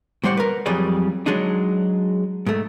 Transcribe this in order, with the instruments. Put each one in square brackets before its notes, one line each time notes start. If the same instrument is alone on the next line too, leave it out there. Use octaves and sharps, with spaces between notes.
[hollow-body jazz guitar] A2 G3 C5 D5 F#5
A#4 B4
F2 F#3 G3 G#4 D5
F#3 G#3 D4 D#4
G#2 A3